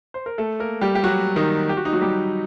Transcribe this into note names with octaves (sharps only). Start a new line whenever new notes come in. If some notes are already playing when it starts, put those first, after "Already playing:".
C5
A#4
A3 A4
A#3 A#4
G3 G4
G4
F#3 F#4
D#3 D#4
G4
F#4
D#4
F#3 F#4
G3 G4